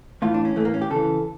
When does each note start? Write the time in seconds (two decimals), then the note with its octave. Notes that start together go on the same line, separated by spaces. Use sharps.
0.22 A2 E3 F4
0.34 D4
0.45 C#4
0.56 E3 A3
0.60 A2 A#3
0.74 C#4
0.82 G4
0.90 C#3 E3 A4